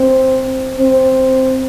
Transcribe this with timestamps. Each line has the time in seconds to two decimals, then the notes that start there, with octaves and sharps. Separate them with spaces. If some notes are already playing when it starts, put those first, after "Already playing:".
Already playing: C4
0.78 C4